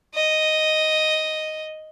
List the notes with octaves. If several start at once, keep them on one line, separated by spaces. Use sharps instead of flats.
D#5